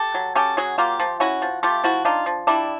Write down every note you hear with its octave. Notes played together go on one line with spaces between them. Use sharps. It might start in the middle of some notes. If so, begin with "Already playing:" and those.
Already playing: G4 A4
F#3
C#4 G4 A4
F#3 F#4 G#4
A#3 F4 G4
F3
C#4 E4 F#4
F3
A3 F4 G4
F3 E4 F#4
D4 D#4 F4
F3
G3 D4 E4